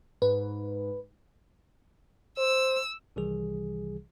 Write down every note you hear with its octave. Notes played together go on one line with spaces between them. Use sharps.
G#2 B4
C5 E6
C2 C3 D#3 E3 G3 G#4